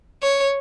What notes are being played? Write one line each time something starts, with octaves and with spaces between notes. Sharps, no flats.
C#5